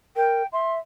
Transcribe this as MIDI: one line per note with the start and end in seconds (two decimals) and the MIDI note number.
0.16 0.43 70
0.16 0.46 79
0.53 0.78 76
0.53 0.72 84